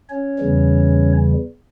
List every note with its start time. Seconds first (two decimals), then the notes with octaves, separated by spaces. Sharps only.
0.10 C#4 C#5
0.39 E2 C#3 E3 G3